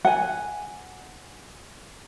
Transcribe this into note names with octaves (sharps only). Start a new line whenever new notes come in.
F#5 G#5